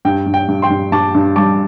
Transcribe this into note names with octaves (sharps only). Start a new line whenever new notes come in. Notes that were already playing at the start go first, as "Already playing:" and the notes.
G2 G5
G2
G5
G2
G5 C6
G2
G2 A5 D6
G2
G3 A5 D6